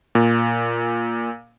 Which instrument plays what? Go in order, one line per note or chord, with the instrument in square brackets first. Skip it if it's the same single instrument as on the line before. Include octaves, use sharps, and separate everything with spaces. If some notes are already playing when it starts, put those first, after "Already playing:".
[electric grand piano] A#2